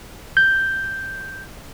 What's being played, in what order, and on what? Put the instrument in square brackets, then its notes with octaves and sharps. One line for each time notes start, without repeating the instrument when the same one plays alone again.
[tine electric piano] G6